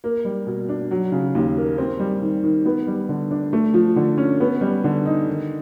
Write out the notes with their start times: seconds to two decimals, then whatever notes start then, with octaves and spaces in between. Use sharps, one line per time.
0.04 A#3
0.25 G3
0.47 B2
0.69 D4
0.91 F#3
1.12 C#3
1.35 D#2
1.57 A#3
1.78 C4
1.99 G3
2.22 D#3
2.43 D#3
2.66 B3
2.87 G3
3.09 D3
3.31 D4
3.53 A3
3.74 F3
3.96 D3
4.18 C#4
4.40 B3
4.61 G3
4.84 D3
5.05 D#4
5.28 D#3